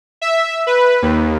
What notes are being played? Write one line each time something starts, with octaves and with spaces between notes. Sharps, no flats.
E5
B4
D#2